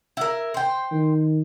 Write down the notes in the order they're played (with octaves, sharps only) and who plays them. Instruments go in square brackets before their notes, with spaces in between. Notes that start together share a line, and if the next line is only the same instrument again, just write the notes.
[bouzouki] E4 A#4
C5 G5
[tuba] D#3